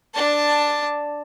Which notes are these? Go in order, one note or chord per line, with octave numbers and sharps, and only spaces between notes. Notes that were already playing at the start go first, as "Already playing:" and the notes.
D4 A5